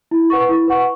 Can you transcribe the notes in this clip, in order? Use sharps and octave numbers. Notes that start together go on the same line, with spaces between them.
E4
B4 F#5 C#6
E4
B4 F#5 C#6